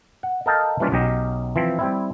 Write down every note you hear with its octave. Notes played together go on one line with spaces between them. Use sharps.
F#5
A4 A#4 D#5 F5 G5 A5
E3 G3 A#3 C#4 D4 F4
B1 F#3 C#4 G4 D#5
E3 F3 C4
G3 C4 E4